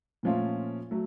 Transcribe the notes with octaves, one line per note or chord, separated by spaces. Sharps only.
A#2 F3 A3 C#4 F4
F#3 A3